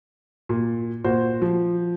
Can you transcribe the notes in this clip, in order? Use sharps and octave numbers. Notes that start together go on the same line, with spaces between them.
A#2
A#2 F#4 C5
F3